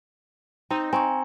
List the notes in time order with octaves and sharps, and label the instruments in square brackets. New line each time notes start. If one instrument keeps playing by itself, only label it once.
[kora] C4 [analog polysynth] D#4 [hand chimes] A#5
[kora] C4 [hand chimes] G#5 A#5 C#6